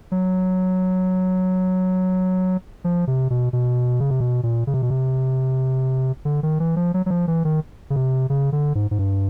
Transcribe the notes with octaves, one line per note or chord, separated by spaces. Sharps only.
F#3
F3
C3
B2
B2
C#3
C3
B2
A#2
C#3
C3
B2
C3
D3
D#3
E3
F3
F#3
F#3
F3
E3
D#3
C#3
C3
C#3
D3
G#2
G#2
G2